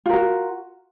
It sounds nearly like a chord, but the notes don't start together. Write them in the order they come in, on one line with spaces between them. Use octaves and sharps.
F4 A#4 F#4